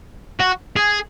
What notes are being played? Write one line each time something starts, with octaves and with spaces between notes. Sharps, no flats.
F#4
G#4